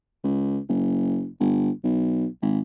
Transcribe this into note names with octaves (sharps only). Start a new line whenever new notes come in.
C#2
F#1
G1
B1
G#1